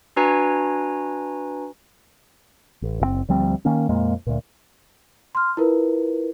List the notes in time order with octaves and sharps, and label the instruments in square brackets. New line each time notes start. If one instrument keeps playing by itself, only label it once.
[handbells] D4 F#4 B4 G#5 A#5
[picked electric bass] A1
F#1 A2 C4
D2 F3 G3 C4
D#3 A#3 C#4
F2 A#2 G#3 A#3
D2 A#2
[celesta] C6 F6
E4 F4 A#4 B4